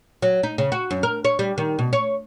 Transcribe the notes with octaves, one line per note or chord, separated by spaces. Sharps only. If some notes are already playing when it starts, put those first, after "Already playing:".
F#3
D#4
C#3
F#4
F#2
A#4
C#5
G3
D#3
B2
C#5